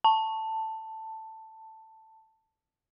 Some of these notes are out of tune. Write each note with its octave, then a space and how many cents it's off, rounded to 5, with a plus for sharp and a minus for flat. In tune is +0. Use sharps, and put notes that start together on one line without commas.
A5 +10